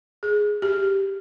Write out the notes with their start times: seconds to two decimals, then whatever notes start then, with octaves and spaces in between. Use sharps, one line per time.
0.23 G#4
0.62 G4